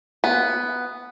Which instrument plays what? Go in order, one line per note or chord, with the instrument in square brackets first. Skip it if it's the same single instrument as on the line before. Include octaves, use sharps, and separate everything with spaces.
[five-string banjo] B3